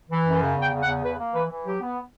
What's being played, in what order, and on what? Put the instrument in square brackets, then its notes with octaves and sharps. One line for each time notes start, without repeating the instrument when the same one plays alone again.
[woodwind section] E3
F#2
C#3
E2
G5
C#3
F#5
E2
C#3 B4
A#3
E3 B4
E3
F#3 G4
B3